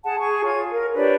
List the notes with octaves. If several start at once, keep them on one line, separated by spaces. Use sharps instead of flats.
G#4 F#5 A5
G#4 C#6
F4 C#5 G#6
A#4
D4 G4 B4 C#5